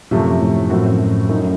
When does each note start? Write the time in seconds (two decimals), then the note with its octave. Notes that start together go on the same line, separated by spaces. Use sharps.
0.11 F#2 C3 F3 A3 C#4
0.41 A2
0.70 F#2 A2 F3 C4 F#4
1.29 F#2 A2 A3 D#4